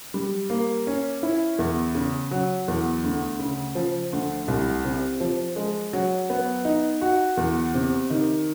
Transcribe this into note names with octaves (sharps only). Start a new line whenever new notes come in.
G3
A#3
C#4
E4
E2
C#3
F#3
E2
D2
C#3
F3
D2
C2
C3
F3
G#3
F#3
B3
D#4
F#4
E2
C3
D#3